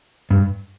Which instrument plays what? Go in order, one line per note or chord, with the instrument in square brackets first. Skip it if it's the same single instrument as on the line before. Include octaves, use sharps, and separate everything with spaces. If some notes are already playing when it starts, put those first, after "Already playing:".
[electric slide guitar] G2